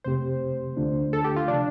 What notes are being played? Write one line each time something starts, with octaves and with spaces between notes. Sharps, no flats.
F2 C3 A3 C4 G4 C5
D2 D3 A3 D4 F4
A4
G4
F4
C3 F3 D4